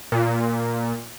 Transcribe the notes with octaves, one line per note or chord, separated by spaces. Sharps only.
A#2